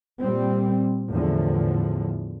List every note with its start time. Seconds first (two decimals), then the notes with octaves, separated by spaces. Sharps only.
0.21 A#2 G3 C4
1.10 E2 A2 D3 F3